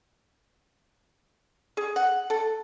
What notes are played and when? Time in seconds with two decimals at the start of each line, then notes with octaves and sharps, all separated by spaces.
1.77 G#4
1.96 F#5
2.30 A4